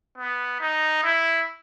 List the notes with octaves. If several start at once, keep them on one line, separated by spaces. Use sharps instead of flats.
B3
D#4
E4